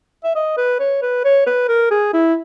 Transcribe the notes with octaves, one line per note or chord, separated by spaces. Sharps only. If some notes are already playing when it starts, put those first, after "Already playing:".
E5
D#5
B4
C#5
B4
C#5
B4
A#4
G#4
E4